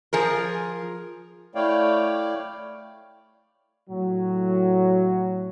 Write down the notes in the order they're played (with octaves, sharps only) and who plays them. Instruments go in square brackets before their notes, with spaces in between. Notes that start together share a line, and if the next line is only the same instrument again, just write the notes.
[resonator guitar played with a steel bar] F3 G#4 A#4
[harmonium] A3 E4 C#5 D5 F5 G5
[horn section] A2 F#3